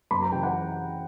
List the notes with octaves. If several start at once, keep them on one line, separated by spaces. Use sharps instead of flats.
F#2 B5
A#5
C#3 E3 G5
F#5